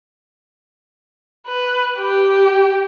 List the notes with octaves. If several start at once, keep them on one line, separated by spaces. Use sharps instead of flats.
B4
G4